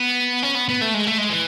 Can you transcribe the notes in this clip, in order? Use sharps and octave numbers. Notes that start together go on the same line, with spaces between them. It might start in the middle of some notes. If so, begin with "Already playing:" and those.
Already playing: B3
C#4
B3
B3
A3
G#3
A3
G#3
E3